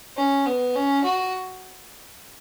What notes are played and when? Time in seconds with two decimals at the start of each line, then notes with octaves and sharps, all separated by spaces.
0.17 C#4
0.46 B3
0.75 C#4
1.04 F#4